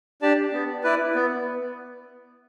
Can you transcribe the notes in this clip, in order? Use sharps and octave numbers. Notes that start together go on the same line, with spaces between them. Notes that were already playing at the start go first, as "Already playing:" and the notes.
D4 G4 D5 A5
B3
E4 B4 D5
B3